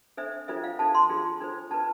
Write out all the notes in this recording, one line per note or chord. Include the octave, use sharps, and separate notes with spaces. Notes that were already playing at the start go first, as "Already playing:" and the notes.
D4 A4 C5 E5
D4 F4 A4 C5 E5
F5
D4 A4 C5 A5
C6
D4 F4 G#4
D4 A4 C5
D4 F4 B4 A5